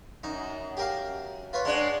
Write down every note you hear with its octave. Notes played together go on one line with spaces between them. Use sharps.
F#2 D#4
G4 A#4 F5
F4 B4 C#5
G#3 D4 C#5 F#5